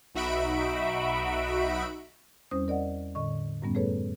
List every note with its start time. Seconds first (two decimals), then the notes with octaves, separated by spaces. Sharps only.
0.15 B1 D#4 F#4 E5 B5 D7
2.51 E2 G3 C4 C#4 C5 D#6
2.68 A#4 D5 D#5 F#5
3.15 A2 D3 D#5 C#6
3.62 F#2 A2 G3 B3 C#4
3.75 A3 G#4 A4 B4 C#5